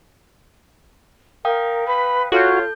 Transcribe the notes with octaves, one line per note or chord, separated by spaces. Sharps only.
A#4 F5 G5 D#6
B4 B5
F4 F#4 A4 C#5 G6